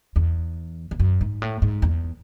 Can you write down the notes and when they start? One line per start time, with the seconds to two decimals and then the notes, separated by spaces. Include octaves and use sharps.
0.16 E2
0.91 E2
0.99 F#2
1.21 G#2
1.42 A2
1.62 G#2
1.82 E2